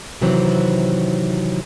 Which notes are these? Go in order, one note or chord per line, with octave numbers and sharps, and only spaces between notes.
C3 D#3 E3 F#3 C4